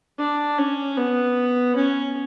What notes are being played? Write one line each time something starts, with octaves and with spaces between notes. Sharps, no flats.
D4
C#4
B3
C#4